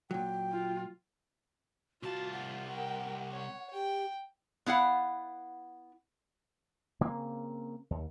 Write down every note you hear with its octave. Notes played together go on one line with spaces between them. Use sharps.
A#2 F#3 G5
F4
C2 F4 F#4 A5
F#5
A#4 G5
C#5
G4 G5
B3 E4 F5 F#5
C#3 A#3 C4
D#2